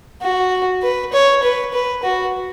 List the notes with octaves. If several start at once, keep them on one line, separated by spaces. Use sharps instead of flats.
F#4
B4
C#5
B4
B4
F#4